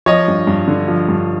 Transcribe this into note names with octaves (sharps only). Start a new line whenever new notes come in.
F3 C#5 D#5
G2
G2
D3
F3
G2